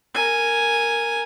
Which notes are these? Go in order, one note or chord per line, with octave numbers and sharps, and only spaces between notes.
A#4 G#5